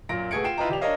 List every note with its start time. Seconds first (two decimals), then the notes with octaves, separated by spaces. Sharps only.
0.09 F#2 A#2 A#6 D7
0.31 B2 A3 G#4 G#6 C#7 D7
0.44 F4 G5 C7 D7 E7
0.58 E4 F4 B4 D#5 G5 A#5
0.69 E1 G4 D5 F7
0.81 D4 A#4 C#5 D#5 F5